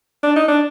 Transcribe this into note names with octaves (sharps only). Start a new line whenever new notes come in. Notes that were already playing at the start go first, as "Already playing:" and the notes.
D4
D#4
D4